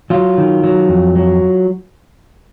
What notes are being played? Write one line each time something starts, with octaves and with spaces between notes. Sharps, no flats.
F#3 F4
D#3
F#3
F2
F#3